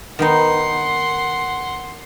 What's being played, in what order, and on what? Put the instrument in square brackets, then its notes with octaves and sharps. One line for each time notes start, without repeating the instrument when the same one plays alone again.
[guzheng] D#3 B3 D#4 [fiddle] F#5 C6